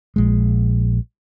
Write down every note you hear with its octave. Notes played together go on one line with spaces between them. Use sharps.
A#1 G#3